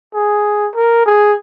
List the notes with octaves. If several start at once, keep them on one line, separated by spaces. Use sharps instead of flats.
G#4
A#4
G#4